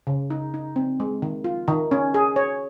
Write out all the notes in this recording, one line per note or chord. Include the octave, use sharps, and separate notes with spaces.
C#3
D#4
D#4
C4
G#3
D#3
F4
D#3
C#4
G#4
C#5